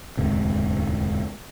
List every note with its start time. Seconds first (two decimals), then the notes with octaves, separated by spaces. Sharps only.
0.17 E1 D2 G#2 C3